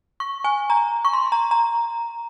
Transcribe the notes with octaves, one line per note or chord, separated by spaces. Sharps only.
C#6
G#5
A#5
C#6
C6
A#5
A#5